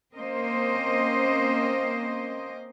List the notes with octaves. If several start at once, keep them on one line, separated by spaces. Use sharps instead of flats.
A#3 C4 C#4 C5 D#5